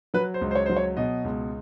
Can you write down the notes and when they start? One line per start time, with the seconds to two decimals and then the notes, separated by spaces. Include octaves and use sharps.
0.14 F#3 B4
0.34 C5
0.41 C#2
0.51 C5
0.55 C#5
0.66 F#3 C5
0.76 C#5
0.97 B2 D#5
1.24 C#2